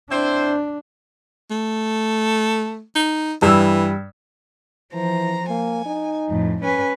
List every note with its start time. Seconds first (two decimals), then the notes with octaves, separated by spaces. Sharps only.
0.10 C4 D4 E4 C5
1.51 A3
2.96 D#4
3.42 G2 E3 E6
4.94 E3 F3 C5 A#5
5.49 A#3 G#5
5.86 D#4
6.29 F2 A2
6.64 C#4 B4 G#5